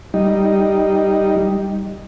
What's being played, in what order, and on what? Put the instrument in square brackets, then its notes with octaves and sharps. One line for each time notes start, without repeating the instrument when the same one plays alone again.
[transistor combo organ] G3 D#4